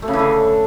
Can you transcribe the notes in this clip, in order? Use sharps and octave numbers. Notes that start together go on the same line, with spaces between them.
A3
C#3
E3
D3